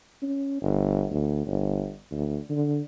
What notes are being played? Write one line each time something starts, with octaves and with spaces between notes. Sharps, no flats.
C#4
G1
D2
G1
D2
D3